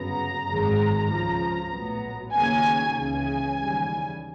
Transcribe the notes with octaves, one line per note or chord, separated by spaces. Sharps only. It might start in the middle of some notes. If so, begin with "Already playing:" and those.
Already playing: G1 F#2 C#3 F#3 B3 A#5
G#1 F#2 D#3 G#3
C#2 C#3 F3
A#1 A2 F#3 B3
D#2 C#3 F#3 A#3 C#4 G#5
C#2 C#3 E3 G#5
D#2 C#3 E3 G3